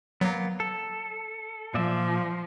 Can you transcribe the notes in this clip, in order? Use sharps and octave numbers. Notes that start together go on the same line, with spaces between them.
F#3 A#3 B3
A4
A#2 F3 D5 E5